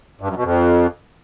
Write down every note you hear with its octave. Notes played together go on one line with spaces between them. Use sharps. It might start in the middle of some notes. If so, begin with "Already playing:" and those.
G2
F#2
B2
F2